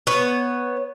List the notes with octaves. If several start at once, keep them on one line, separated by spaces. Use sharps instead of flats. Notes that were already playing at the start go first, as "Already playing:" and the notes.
B3 C#5